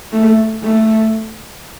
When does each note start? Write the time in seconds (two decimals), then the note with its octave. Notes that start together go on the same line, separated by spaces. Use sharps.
0.12 A3
0.62 A3